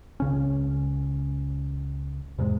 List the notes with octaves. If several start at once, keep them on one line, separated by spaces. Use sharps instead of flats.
C#2 C#3 C#4
E2 G#2 C3 G#3